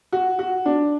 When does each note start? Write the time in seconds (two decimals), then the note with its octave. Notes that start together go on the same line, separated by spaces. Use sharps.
0.13 F#4
0.39 F#4
0.65 D4